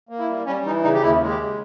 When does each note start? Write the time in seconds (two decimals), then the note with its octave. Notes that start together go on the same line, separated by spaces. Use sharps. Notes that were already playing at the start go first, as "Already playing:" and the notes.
0.09 A#3
0.19 E4
0.28 G3
0.46 G3 C#4
0.65 E3 D#4
0.83 C#3 D#4
0.94 G4
1.02 D#2 E4
1.21 G#3
1.30 G4
1.39 C#3